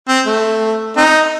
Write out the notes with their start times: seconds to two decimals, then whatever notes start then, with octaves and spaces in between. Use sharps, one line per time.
0.08 C4
0.26 A3
0.97 C4 D#4